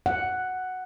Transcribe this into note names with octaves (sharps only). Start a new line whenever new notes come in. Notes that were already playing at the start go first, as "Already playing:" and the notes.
F#5